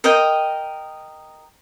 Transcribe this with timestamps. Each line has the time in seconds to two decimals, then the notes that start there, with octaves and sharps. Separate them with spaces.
0.04 A#4 D#5 G5